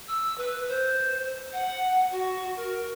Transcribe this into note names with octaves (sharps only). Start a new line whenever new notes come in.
E6
B4
C5
F#5
F#4
A#4